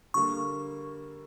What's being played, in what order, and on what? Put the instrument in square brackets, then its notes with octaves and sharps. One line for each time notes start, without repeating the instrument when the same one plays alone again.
[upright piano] D3 G3 A#3 [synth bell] C#6